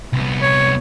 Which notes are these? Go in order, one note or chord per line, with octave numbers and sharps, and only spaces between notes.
C2 B3
C#5